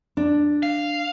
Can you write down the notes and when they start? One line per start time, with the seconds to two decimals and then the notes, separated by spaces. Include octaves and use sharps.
0.17 D4
0.63 F5